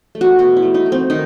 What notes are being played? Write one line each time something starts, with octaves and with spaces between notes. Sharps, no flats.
A3
F#4
B2 F#4
E4
A3
D#4
A3
C4
D#3 D#4